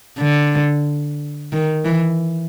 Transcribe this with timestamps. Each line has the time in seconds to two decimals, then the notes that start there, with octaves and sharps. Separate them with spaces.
0.19 D3
1.53 D#3
1.85 E3